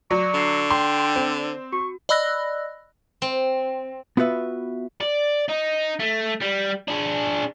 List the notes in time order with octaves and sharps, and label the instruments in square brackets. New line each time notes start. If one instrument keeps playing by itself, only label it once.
[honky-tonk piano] F#3 [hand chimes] D5 [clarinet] C#6
[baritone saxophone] D3 [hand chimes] D5 C7
[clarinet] G5 [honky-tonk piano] C6
[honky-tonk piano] C4
[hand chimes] F#4 [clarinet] C#6
[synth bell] D5 D#5 B5 E6 F#6 A#6
[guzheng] C4
[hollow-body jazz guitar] B3 F4 F#4 B4 E5
[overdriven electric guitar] D5
D#4
A3
G3
D4 G#4